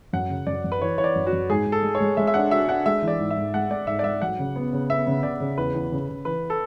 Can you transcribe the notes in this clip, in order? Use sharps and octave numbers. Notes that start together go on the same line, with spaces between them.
F#2 F#5
C#3
F#2 D5
F#2
B4
E3 C#5
E3 C#5
D5
F#2
F#4
F#2
G#2 G#4
G#2
A4
G#3
C#5
G#3
G#3 E5
E5
D4 F#5
F#4 E5
D4 F#5
G#3 E5
E3
D5
G#2
E5
G#2
G#3 F#5
G#3 D5
G#2 E5
D5
G#2 E5
F#3 F#5
C#3
B3
C#3
B3 E5
C#3
C#3 D5
C#3
E2 B4
E2
C#3
C#3
E3 B4
A4